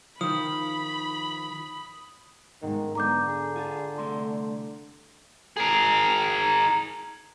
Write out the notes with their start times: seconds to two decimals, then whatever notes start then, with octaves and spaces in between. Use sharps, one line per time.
0.21 D#3 F3 B5 D#6
2.62 B1 G#2 D#3 G#3
2.95 F#2 D3 B3 A#5 D6 G6
3.28 G#4
3.56 F4 G#4 G#5 A5
3.98 C2 A3 C6
5.57 G#4 A#4